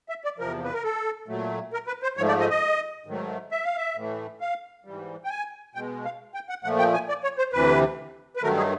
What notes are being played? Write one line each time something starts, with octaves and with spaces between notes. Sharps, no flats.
E5
D5
E2 C3 F3 A#4
B4
A#4
A4
A#2 F#3 A3
A#4
B4
C5
G#2 F3 A3 C#5
D5
D#5
D#5
G#2 D#3 F#3 A3
E5
F5
E5
A2 E3 A3
F5
G#2 E3 G3
G5
G#5
B2 G#3 G5
F5
G5
F#5
A#2 F3 A3 F#5
G5
G#5
D5
C#5
C5
D2 C3 E3 B4
B4
G2 D#3 F#3 A3 A#4
G#4